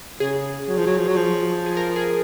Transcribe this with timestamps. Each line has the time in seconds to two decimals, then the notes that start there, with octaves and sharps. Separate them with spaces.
0.20 C#3 G#4
0.68 F#3
0.77 F3
0.86 F#3
0.98 F3
1.07 F#3
1.16 F3
1.66 G#4
1.77 A#4
1.96 G#4